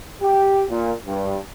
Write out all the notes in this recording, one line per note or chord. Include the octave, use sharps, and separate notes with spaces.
G4
A#2
G2